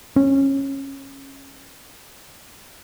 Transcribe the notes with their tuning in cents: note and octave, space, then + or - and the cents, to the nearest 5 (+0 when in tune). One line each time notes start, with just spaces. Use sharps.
C#4 -20